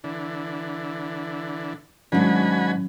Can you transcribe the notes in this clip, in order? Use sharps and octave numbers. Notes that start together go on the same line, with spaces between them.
D3 E3
G#2 D#3 F#3 C#4 D4 F#4 G#5 B5